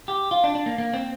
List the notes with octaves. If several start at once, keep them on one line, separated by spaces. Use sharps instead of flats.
G4
F4
D4
D4
A#3
A#3
C4